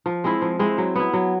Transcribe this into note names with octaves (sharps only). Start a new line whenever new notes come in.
F3
G#3 C4 E4
F3
G#3 C4 E4
F#3
B3 E4
F#3